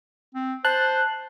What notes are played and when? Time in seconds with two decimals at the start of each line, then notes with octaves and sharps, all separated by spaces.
0.35 C4
0.65 C5 A5 F#6